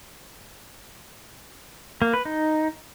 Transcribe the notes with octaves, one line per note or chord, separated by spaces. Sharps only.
A#3
B4
D#4